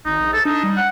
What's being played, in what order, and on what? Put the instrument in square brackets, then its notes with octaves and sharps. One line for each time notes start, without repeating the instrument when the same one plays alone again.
[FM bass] G#1 [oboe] D#4
[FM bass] A#1
[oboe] A4
[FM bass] D4 [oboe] D#4
[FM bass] G3
[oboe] F#5